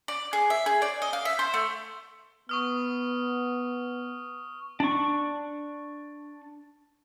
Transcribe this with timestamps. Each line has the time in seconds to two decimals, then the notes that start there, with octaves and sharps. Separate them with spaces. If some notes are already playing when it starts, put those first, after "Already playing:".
0.08 D5
0.33 G#4
0.50 E5
0.66 G#4
0.82 D5
1.02 D#5
1.13 F5
1.25 E5
1.39 C5
1.54 A3
2.49 B3 C#6 D#6 F6
4.80 D4 C#6